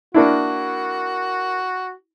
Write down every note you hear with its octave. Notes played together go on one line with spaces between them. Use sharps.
A#3 D4 E4 F#4